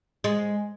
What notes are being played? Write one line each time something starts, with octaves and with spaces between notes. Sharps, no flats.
G#3